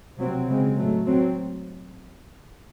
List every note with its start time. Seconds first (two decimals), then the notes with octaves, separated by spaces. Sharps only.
0.18 C3 F#3 C4
0.47 C#3 G#3 C4
0.77 A2 F#3 A3
1.06 F#3 C4